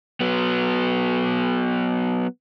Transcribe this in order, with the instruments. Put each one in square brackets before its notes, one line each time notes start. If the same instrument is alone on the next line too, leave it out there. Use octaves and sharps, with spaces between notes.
[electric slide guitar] F#3 B3